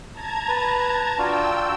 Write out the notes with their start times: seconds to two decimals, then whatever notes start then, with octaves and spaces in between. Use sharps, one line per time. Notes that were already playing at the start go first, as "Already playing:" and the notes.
0.12 A5 A#5 G#6
0.49 B4
1.18 D4 F4 F#4 G5 E6